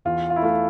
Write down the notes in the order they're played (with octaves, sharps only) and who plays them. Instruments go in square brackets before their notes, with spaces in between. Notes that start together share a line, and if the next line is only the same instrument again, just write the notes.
[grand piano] E2 F4
F4
E4
A3 F4